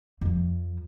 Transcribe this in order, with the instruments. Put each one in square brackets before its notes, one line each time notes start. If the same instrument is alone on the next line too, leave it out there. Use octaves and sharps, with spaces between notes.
[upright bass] F2 F3